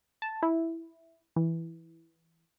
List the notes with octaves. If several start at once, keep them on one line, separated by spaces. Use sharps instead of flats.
A5
E4
E3